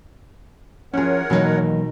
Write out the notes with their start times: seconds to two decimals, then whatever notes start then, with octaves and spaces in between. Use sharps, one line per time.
0.94 F3 C#4 E4 G#4 A#4 C#5 F#5
1.30 B2 D#3 E3 F#3 A#3 D#4